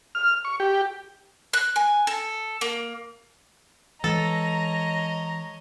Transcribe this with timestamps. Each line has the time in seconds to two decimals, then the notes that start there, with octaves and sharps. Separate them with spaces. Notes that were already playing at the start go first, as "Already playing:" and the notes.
0.15 F6
0.45 C#6
0.60 G4
1.53 F#6
1.76 G#5
2.07 A4
2.61 A#3
4.04 E3 G#3 A4 C#5 D#5 A#5